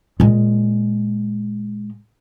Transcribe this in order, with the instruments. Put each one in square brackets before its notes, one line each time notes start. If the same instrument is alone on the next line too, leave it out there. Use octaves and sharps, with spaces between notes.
[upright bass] A#2 G#3